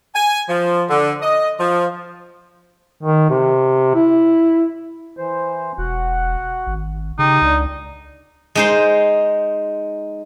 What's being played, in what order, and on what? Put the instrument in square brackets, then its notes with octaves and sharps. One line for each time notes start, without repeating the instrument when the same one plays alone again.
[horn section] G#5
F3
D3
D#5
F3
[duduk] D#3
C3
E4
[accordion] E3 C5
[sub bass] E1 [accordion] F#4 F#5
[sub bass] G#1
[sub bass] C#3 [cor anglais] D#4 [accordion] G4
[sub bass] C#2 [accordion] D3
[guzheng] G#3 D#4 C5